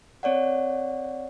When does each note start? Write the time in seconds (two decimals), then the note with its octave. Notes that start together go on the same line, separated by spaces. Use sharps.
0.23 C4 C#5 D5 F#5